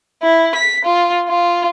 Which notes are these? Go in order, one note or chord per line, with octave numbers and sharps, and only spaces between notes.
E4
B6
F4
F4